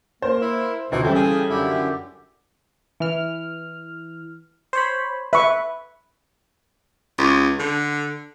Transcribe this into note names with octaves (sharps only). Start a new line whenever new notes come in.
A#3 A#4 C5
E4
D2 B2 E3 D#4 F4 F#4 C5
C#3 E3 G3 C4 A4
G#4 G5 D#6
F#2 D3 E4 G4
E3 F6
C5 C#5 B5
B4 E5 C#6
C#2
D3